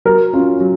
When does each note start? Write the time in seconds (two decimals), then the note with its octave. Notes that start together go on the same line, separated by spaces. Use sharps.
0.05 F#3 A#4
0.33 C#4 F4
0.60 F#3